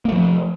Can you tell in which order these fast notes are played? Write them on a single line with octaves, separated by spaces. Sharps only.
A#3 A3 F3